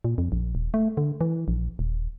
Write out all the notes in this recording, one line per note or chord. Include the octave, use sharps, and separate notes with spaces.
A#2
F2
A#1
D#1
A3
D3
E3
A#1
D#1